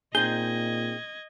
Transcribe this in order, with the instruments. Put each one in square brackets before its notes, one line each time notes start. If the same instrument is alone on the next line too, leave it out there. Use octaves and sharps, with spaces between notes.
[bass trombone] A#2 [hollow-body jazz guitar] C4 D#4 G#4 [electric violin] D#5 G#6 [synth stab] G6